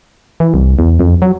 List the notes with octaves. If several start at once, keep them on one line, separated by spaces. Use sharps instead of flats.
E3
C2
E2
F2
F#3